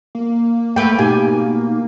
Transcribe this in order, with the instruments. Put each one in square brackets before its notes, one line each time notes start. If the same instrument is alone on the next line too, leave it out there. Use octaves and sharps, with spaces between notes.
[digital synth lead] A#3
[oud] A3 B4 [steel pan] G5
[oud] B2 [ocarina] D#4 [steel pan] G4 G#5